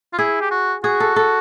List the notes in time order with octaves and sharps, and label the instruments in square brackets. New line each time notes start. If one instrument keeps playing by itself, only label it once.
[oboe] F4
[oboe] E4 [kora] G#4
[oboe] G4
F#4
[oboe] F#4 [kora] G#4
[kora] A4
A4